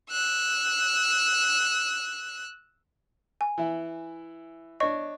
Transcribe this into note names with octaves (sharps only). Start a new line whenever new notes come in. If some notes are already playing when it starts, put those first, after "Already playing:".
E6 F#6
G#5
E3 E4
D4 C#5 D#5 C#6